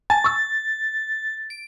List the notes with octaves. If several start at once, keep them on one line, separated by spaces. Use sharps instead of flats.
G#5 A5 A6
C#6 E6
D7